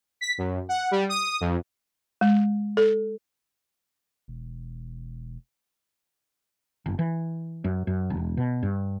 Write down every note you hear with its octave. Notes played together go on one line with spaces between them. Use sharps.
B6
F#2
F#5
G3
D#6
F2
G#3
A4
E1
F#1
E3
F#2
F#2
E1
B2
G2